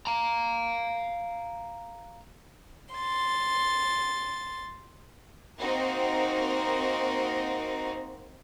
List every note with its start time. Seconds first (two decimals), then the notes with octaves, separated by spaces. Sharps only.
0.07 F5 A#5
2.95 C6 A6
5.60 A#3 C4 D#4 F#4 A#4